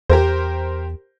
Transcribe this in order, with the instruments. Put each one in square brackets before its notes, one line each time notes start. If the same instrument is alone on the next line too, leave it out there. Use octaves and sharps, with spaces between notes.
[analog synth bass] E2 [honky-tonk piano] G4 A#4 C5